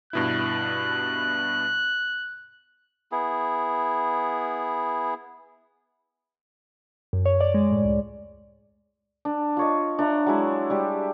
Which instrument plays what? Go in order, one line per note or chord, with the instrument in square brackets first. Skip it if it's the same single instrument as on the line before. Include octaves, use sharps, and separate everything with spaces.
[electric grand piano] G2 B2 E4 [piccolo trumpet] F#6
[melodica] B3 E4 G#4
[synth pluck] F#2
C#5
D5
G#3
A2
C#2
[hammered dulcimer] D4
F4 C#5 D#5
D4 E5 A#5
F#3 G#3 E4
G3 G4